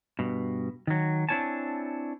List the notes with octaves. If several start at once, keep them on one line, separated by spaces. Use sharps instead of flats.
G2 B2
D#3 F#3
C4 D4 E4 C#5 G#5 A5